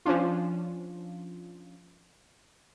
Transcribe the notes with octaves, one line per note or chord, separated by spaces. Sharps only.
F3 C#4 D4 F4